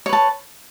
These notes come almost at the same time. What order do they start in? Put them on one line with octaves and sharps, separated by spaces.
C#5 B4 A5